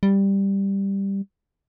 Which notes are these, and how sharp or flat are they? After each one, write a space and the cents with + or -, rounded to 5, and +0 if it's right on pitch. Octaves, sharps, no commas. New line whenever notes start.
G3 +5